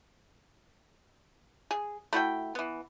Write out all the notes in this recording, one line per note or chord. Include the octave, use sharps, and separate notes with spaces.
G#4
A3 E4 F#4 G5
E3 B3